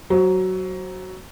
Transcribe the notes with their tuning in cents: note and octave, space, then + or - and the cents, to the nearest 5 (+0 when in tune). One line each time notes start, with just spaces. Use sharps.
F#3 +15 C5 +25